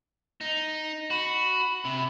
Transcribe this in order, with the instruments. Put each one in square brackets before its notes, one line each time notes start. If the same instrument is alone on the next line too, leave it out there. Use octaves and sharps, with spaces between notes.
[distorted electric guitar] D#4
[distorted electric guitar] F#4 [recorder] B5
[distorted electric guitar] C3